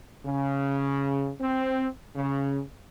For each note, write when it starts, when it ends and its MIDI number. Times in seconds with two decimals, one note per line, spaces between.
0.25 1.31 49
1.40 1.86 60
2.15 2.61 49